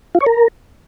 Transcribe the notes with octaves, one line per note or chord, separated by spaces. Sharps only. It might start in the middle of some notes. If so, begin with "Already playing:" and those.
F4
C#5
A#4